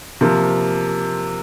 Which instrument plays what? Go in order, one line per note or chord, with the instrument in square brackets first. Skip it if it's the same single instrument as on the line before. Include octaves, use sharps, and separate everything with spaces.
[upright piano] C3 F3 A#3